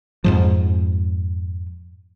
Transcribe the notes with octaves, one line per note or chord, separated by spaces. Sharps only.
F2 G#2 F3